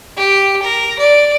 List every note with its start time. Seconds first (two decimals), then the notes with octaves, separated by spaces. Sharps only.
0.17 G4
0.62 A#4
0.99 D5